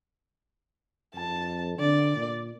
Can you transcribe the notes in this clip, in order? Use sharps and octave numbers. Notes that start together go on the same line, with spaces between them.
F2 A5
D3 D5
A#2